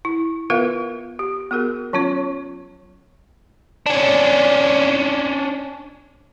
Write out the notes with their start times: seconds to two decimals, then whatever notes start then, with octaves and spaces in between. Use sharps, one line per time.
0.05 E4
0.50 B3 F4 A#4 B4 E5 F5
1.19 G4
1.51 B3 F#4 G#4 A#4
1.93 F#3 C#4 F4 C#5
3.86 C#4 D4